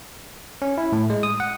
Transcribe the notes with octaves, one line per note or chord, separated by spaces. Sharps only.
C#4
E4
A2
G#3
D#6
F#5